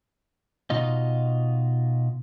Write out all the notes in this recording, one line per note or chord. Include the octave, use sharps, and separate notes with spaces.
B2 D#4 F4 D#5